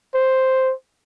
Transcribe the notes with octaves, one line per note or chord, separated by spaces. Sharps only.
C5